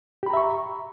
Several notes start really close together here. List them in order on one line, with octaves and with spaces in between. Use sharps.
G4 B5 A#5 E5 C#6